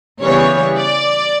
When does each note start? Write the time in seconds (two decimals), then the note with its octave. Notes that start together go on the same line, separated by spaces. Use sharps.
0.21 C#3 E3 G3 B3 C#5
0.77 D5